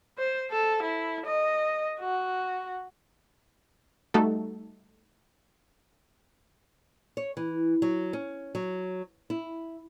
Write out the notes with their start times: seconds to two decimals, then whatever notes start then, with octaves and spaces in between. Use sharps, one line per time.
0.18 C5
0.51 A4
0.83 E4
1.26 D#5
1.99 F#4
4.14 G3 A3 D#4 F#4 A4
7.17 C#5
7.37 E3
7.82 F#3
8.13 C#4
8.55 F#3
9.30 E4